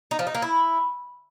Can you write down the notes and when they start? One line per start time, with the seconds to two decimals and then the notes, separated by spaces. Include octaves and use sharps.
0.11 D#4
0.19 F3
0.27 D#4
0.35 A#3
0.42 E4